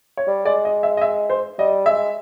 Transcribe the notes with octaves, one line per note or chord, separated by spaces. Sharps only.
C#5
G3
G#3 D5
D#5
E5
D#5
E5
C5
G3 D#5
G#3 E5